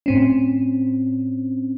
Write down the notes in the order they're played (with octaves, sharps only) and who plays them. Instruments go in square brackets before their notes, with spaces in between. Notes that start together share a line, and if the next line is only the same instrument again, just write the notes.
[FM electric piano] A2 C4 C#4